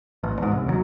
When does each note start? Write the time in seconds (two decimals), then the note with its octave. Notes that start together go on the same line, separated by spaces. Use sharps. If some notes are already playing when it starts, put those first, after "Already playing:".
0.23 A1
0.39 E2 G#2
0.52 C2
0.66 D#2 C#3 F#3